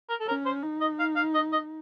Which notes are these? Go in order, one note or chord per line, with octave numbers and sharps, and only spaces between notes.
A#4
A4
C#4 A#4
C5
D#4
D#5
F5
F5
D#5
D#5